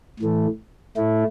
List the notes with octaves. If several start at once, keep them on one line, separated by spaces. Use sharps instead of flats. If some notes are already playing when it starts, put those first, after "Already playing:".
A2 E3 A3
A2 A3 E4